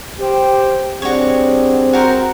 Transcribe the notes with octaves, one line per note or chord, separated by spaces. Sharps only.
G4 C5 G5
G3 C4 D4 F#4 G#4 C#5
F#4 A#4 C5